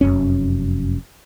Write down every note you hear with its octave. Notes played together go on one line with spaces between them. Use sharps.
F1 F#2 C#4